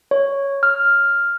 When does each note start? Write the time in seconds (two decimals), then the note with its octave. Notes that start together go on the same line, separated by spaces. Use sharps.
0.11 C#5
0.63 F6